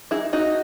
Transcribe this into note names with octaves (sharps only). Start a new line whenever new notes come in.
D#4 E4 G#4
D#4 F#4